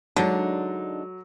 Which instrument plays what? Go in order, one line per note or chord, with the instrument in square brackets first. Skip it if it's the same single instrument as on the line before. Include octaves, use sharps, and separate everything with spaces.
[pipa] D3 [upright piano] F#3 [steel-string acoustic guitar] G#3 D4 D#4